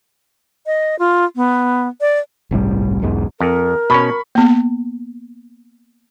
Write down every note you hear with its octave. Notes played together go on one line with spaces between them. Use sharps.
D#5
F4
B3
D5
G1 C2 A2 G3
B1 E2 G#2
F2 A#4
B2 C#4 B5 C#6
A#3 B3